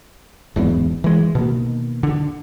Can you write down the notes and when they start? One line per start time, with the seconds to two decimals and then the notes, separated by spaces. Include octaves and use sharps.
0.56 D1 E2 G#2 B3
1.04 E3 G#3
1.35 B2 D#3 A#3
2.03 D3